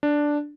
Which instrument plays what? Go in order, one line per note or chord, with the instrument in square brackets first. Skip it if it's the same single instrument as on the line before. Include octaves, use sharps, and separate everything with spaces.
[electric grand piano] D4